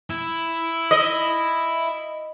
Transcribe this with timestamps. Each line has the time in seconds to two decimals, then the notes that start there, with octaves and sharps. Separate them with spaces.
0.10 E4
0.91 D#5